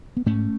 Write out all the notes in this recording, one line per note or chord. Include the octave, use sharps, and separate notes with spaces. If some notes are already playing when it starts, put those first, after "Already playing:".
B3
G#2 A3 C#4